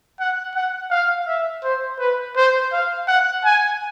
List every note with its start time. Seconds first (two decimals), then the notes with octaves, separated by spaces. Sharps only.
0.20 F#5
0.55 F#5
0.91 F5
1.27 E5
1.64 C5
1.99 B4
2.37 C5
2.73 F5
3.08 F#5
3.45 G#5